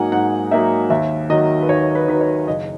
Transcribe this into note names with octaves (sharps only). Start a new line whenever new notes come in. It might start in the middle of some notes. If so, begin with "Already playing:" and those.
Already playing: G#2 F#3 A#3 D#4 F#5 G#5
G#2 F#5
F#3 A#3 D#4 E5
D#2 E5
D#3 F#3 D#5
B4
D#2 C#5
B4
D#3 F#3 B4
C#5
F#1 D#5